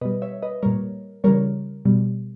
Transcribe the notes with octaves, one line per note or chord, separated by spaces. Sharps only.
B2 G3 B4 D#5
C#5 E5
B4 D#5
A#2 G3 A#4 C#5
C#3 E3 G3 A#4 C#5
B2 G3